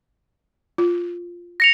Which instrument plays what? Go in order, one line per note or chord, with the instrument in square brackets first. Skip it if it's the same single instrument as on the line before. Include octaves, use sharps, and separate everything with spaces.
[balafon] F4
[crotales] A#6 C#7 F7